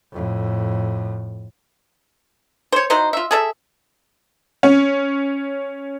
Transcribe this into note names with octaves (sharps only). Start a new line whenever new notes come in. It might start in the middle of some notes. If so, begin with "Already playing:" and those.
F2 A2
C5 C#5
D#4 E4 F#4 C5
F4 E5
G#4 A4 E5
C#4